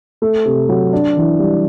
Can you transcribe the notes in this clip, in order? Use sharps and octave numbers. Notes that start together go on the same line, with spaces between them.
A3
C3
F#3
D4
E3
G3